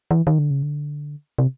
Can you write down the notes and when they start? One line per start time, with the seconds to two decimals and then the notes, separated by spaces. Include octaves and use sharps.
0.11 E3
0.27 D#3
0.38 D3
0.51 C#3
0.63 D3
1.38 C3